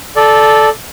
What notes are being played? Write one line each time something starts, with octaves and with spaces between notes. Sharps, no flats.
A4 D5